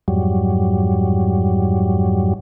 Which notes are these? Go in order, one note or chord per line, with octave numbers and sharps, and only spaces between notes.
F2 G#2 F#3 G3